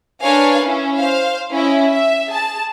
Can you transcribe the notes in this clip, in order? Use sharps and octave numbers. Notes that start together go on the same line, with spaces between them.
D4 A#4 B4 C#5 F5 G#5
C#4 E4
C5 F5
C#4 E4 D#5
E5
G#4 A5